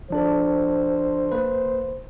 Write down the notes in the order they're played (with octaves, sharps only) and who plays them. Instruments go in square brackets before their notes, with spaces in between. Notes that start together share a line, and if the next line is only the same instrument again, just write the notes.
[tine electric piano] F3 D4 A4 [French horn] C5
[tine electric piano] A#3 B4